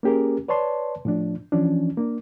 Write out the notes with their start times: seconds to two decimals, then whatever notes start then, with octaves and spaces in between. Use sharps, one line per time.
0.03 A#3 C#4 G4 G#4 A#4
0.48 B4 C#5 D5 A5 C6
1.05 A2 F3 D4
1.52 E3 F3 C#4 D4
1.97 A#3 D4